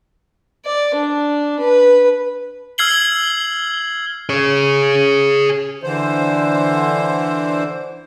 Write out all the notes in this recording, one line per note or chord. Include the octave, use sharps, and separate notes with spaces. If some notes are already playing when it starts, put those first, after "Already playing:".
D5
D4
B4
E6 F6 G#6 C7 F#7 G7
G#4 C#5
D3 E3 C5